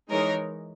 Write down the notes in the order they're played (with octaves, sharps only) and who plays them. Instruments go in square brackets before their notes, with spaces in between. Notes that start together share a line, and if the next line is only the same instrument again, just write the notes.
[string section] E3 G#3 D#4 A#4 C#5